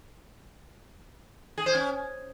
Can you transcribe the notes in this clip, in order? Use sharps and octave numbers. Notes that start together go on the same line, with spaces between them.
G#4
C5
C#4